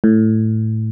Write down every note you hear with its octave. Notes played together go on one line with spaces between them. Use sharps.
A2